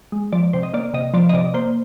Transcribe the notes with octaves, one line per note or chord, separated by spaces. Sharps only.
G#3
F3 D5
C3 C5
D#5
A#3 D5
C3 D#5
F3 D5
D#5
C3 D5
A#3 C5